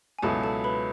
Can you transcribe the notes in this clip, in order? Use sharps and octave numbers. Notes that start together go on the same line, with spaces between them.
G#5
C#2 B2 F#3 B3 E4 A4 A5
A4 A5
B4 B5